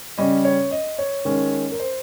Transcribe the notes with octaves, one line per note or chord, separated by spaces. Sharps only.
C#3 G3 C#4 D#5
C#5
D#5
C#5
D#3 G#3 C#4
A#4
C5